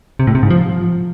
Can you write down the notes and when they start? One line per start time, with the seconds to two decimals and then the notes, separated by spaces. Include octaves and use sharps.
0.19 C3
0.27 A2
0.35 C3
0.43 G#2
0.50 F3